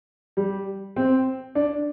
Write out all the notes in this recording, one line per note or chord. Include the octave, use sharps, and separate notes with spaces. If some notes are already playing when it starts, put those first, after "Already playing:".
G3
C4
D4